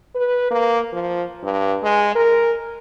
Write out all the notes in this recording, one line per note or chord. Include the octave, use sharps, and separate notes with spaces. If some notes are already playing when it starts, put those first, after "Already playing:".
B4
A#3
F3
G2
G#3
A#4